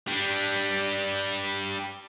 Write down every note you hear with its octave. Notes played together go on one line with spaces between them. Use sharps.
G3 D4